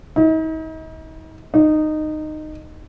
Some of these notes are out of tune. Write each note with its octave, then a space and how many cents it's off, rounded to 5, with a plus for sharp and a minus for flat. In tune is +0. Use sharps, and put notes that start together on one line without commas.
D#4 +40
D#4 -15